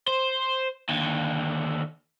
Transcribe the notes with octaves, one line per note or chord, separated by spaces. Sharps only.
C5
D#2 D3